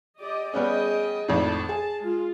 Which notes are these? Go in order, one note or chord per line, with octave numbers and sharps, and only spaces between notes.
G4 D5 D#5
G3 B3 C#4 G#4 D#5 G5
G#1 F2 A2 A5
G#4
G#3 F4